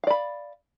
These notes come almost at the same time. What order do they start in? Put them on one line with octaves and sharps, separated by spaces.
F5 D5 B5